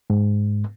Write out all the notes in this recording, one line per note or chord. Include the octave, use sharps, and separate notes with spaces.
G#2